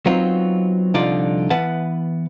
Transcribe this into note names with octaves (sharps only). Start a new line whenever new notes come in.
F#3 B3 C4 D#4 F4
C2 D3 F3 D#4 F4 D5
E3 B3 B4 F#5 A5